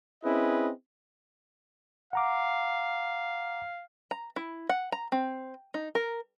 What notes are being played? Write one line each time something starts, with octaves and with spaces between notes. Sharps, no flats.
C4 C#4 E4 G#4 B4 D#5
F5 F#5 A#5 D6
A#5
E4
F#5
A#5
C4
D#4
A#4